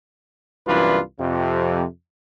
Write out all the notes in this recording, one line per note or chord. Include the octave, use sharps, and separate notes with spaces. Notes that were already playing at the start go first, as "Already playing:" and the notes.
C2 F#2 E3 D4 F4 B4
F2 C3